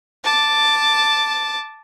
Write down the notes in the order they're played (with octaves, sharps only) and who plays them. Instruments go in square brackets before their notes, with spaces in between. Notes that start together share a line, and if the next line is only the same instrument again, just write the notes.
[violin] A5 D6